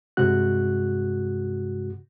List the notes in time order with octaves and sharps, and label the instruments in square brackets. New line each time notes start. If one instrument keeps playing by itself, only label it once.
[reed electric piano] G2 C3 G#3 F#4 F#6